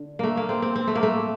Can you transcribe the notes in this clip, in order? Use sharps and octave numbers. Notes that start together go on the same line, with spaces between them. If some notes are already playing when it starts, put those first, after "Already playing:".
Already playing: D3
A3 A#3
A#3
C4
C4
C4
A3
A#3
A3